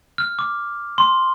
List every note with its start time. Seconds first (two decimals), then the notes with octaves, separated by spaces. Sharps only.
0.18 F6
0.39 D6
0.98 C6